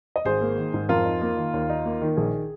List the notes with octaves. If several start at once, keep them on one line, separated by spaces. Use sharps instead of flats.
D#5
G#1 G#4 C5
A#3
D#3
G#2
F2 F4 A#4
D#4
A#3
D#3
D#2
D#4
A#3
D#3
A#1 G#4